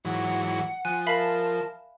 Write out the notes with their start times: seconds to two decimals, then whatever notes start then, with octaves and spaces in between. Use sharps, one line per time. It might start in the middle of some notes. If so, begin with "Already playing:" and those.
0.05 G#2 E3 F#3 F#5
0.85 F3 G#5 F#6
1.07 A#4 E5 F5 A5 B5